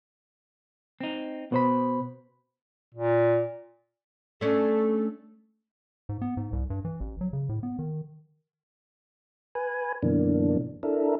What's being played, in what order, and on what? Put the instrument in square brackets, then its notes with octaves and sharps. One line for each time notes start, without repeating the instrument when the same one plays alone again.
[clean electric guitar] C4 D#4
[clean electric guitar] B2 [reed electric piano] B3 C5 B5
[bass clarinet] A#2
[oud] A3 C#4 D4 [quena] A4
[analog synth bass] G#2
B3
G#2
C2
G2
E3
A1
F#3
C#3
A2
B3
D#3
[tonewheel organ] B4 G#5
F#2 B2 D3 E3 A#3 D4
D4 E4 A4 A#4